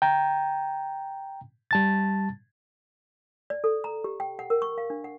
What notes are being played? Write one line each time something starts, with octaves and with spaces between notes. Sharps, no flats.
G5 A#5
G3 A5 A6
D5
A4
A#5
G4
G5
F#5
A#4
C#6
F5
D4
F#5